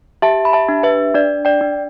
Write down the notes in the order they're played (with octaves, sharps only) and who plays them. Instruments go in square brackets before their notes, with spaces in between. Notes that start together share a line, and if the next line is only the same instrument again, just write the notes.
[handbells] G4 E5 A5
B5
E5 A5
D4
B4 E5
D4 D5
D5 G5
D4